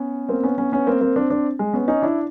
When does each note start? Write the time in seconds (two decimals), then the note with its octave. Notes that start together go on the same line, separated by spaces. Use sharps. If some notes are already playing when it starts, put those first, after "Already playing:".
Already playing: B3 C#4
0.29 A#3 C4
0.43 B3 C#4
0.58 B3 C#4
0.72 B3 C#4
0.87 A#3 C4
1.01 A#3 C4
1.16 C4 D4
1.30 C4 D4
1.59 G#3
1.74 B3 C#4
1.88 C#4 D#4
2.02 D4 E4